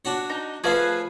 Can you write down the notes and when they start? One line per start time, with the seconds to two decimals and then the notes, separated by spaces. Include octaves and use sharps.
0.05 D4 F#4 C#5
0.30 D#4
0.64 F3 A3 G#4 B4 F5